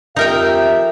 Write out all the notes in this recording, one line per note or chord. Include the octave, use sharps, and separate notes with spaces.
F2 D#4 G4 A#4 E5 G5